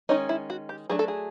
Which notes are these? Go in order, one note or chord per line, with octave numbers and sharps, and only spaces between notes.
D#3 G#3 C#4 D#4
E4
F#4
G4
F#3 A3 D4 G#4
A4
G#4